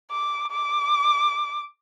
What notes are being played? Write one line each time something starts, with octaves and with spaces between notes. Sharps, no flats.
D6
D6